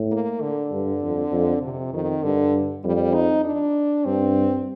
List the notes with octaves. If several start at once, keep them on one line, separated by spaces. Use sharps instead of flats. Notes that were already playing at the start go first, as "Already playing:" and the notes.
Already playing: A2
A#3
D3
G2
F2
F2
C3
F2 D#3
G2 D3
F2 G3
D#4
D4
G2 C4